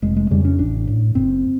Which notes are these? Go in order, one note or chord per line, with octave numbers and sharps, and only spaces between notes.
F1 G#3
G#3
F2 C#3 G3
C#4
A1 D4
A2
F#1 C4